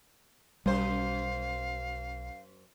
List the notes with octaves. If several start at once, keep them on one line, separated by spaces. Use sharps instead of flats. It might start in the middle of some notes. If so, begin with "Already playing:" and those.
B1 F#2 G3 C5 F5